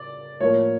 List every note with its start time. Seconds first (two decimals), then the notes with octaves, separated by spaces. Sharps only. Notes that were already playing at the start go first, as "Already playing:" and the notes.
Already playing: C#3 D5
0.41 A2 F3 A#3 C#5